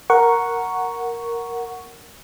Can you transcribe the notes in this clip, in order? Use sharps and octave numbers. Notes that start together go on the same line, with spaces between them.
A#4 F#5 C#6